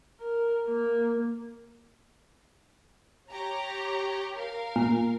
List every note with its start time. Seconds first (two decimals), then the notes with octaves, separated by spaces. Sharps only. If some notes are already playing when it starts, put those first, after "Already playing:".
0.20 A#4
0.67 A#3
3.31 G4 C#5 A#5
4.35 A#4 F5
4.76 A#2